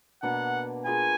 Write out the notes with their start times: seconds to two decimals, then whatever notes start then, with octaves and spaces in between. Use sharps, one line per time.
0.23 B2 A#3 D4 F#5
0.85 A#3 F4 G#4 B4 G#5